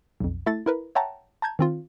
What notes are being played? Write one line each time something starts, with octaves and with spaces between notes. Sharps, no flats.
B1 F2
A3 E4 A4 A6
E4 A#4 B4
C#5 E5 F#5 G5 A5 A#5
A5 A#5 G6 G#6
D#3 C4 F4